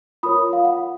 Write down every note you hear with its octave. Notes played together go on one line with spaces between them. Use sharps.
F4 A#4 C#5 B5 D#6
F5
F#5